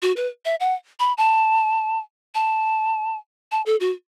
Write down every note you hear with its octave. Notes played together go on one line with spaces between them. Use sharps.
F#4
B4
E5
F#5
B5
A5
A5
A5
A4
F#4